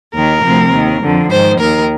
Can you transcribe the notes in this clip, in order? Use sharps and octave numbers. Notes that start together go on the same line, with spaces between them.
D#2 D#3 A#4
D2 C3 F3
D#2 D#3
F2 D3 F3
G#2 D#3 C5
D#2 D#3 A#4